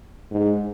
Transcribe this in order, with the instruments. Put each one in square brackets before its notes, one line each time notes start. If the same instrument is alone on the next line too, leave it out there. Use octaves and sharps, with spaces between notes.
[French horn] G#2